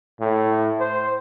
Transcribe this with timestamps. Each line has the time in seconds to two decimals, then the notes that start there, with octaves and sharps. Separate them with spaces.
0.21 A2
0.79 C5